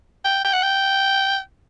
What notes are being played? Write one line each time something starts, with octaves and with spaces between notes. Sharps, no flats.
G5
G5
F#5
G5